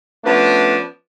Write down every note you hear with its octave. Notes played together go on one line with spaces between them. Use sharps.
F3 A3 B3 C#4 D4